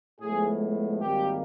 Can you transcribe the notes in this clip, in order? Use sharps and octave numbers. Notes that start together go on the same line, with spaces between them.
A2 F3 G#3 B3 G#4
G#1 G#2 D#3 G3 A#3 G4